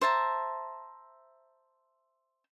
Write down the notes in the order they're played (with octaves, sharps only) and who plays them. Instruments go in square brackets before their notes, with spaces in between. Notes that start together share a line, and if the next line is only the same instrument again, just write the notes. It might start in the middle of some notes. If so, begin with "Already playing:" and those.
[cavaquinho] C5 E5 A5 A#5